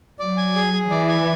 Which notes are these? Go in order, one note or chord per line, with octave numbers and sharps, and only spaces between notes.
F#3 D5
G#5
G#4
G#4
E3 D5
G#5